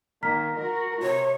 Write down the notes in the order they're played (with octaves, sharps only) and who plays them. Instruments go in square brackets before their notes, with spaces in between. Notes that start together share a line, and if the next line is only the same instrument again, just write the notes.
[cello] D#3 A#3 [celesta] A#5 F6 B6
[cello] F#4 A#4
[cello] C3 [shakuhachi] C#5